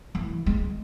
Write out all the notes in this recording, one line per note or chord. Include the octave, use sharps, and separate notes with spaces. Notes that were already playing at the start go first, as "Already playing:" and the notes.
E3
G#3